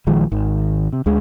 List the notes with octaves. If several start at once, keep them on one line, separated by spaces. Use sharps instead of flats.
A#1 D#3 F3 G#3
G#1 D#3
C3
D2 D3 G#3